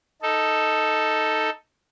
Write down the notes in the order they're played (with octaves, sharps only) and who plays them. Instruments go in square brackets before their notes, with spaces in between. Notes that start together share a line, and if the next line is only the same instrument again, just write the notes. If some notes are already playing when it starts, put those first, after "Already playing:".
[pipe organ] D#4 A4